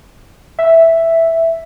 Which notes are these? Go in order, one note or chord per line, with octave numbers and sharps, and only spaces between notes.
E5